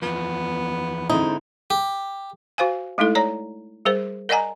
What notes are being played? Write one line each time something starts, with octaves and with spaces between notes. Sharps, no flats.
E2 F3 B3
G#2 D3 C4 D#4 E4
G4
F#4 C5 F5 G#5
G#3 A3 D#4 E4 A4
C#5 D5 A#5
G3 G#4 A#4 C5
A#4 D5 D#5 F#5 G#5 A#5